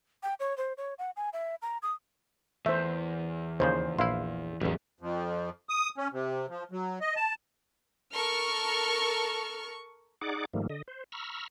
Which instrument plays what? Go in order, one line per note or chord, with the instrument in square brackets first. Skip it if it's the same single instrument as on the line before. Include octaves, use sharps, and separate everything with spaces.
[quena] G5
C#5
C5
C#5
F#5
G#5
E5
A#5
D#6
[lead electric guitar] E2 [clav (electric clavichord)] A3 [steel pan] C5 E5
[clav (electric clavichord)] D#2 C#3 F3 [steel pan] C5 C#5
[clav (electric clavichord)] A#1 E4 [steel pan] E5 F5 C6
[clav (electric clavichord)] A1 E2 [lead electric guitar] F#3 B3
[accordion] F2
D#6
C#4
C3
F3
F#3
D#5
A5
[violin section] A4 A#4 C#6 F6
[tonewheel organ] D#4 G#4 D5 F#5 D6
G#2 D#3 F3 G3 A3 A#3
D3 D#5
C5
A#5 B5 C#6 E6 F6